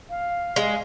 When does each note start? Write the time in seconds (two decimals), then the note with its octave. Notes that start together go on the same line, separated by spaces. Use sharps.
0.10 F5
0.56 G#3